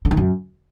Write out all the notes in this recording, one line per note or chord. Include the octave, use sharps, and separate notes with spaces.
D3
D#3
F#2